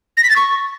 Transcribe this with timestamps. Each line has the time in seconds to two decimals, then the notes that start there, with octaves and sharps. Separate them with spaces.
0.17 A#6
0.23 B6
0.30 A6
0.36 C#6